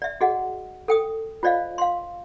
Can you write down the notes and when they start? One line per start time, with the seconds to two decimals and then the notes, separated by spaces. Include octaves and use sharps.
0.02 D5 E5
0.21 F#4 G#4 D#5 F#5
0.88 A4 G5 D#6
1.43 F4 C5 D5 D#5 F5
1.78 F5 C6